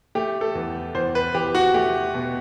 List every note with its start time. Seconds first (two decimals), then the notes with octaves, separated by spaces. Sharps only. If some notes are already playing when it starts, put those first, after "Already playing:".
0.15 A3 G4
0.41 A4
0.55 E2
0.94 E2 C5
1.15 B4
1.34 E2 G4
1.55 F#4
1.74 A3 G4
2.14 B2